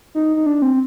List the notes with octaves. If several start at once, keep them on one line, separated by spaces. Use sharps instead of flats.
D#4
D#4
D4
C4